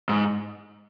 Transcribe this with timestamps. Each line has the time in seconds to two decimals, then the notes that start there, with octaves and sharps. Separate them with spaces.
0.09 G#2